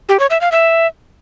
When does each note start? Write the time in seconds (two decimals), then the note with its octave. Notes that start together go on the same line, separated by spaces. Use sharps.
0.09 G4
0.20 C#5
0.30 E5
0.41 F5
0.52 E5